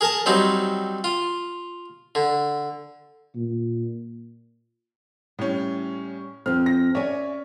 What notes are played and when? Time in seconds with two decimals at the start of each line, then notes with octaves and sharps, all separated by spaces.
0.01 G#4 A#4 G#5 A5
0.26 F#3 G3 C4 D#4
1.04 F4
2.15 D3
3.35 A#2
5.39 A2 G3 C#4
6.46 F2 C4 F6
6.66 A#6
6.95 C#4 C#5 D5 E5 G#5